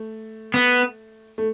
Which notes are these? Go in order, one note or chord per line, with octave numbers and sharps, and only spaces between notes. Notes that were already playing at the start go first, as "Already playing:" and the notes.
Already playing: A3
B3
A3